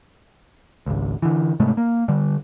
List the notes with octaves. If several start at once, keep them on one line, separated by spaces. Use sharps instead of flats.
G#1 C#2
D3 E3
G#2 C3 G#3 A3
A#3
D3 G3